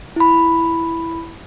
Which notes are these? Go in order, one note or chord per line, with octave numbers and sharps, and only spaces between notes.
E4 B5